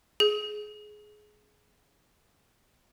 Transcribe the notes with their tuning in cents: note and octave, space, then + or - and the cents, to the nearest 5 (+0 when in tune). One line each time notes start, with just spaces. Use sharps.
G#4 +20